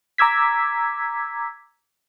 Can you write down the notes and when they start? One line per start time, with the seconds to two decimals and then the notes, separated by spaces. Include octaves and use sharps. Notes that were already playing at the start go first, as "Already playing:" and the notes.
0.18 A#5 D6 E6 G#6 B6